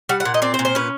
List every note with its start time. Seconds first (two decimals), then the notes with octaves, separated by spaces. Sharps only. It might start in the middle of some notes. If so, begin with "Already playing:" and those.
0.09 G3 F#5
0.20 F#5
0.25 A#2
0.34 D#5
0.42 C4 D5
0.54 C5
0.59 A#2
0.65 C5
0.75 C#4 B4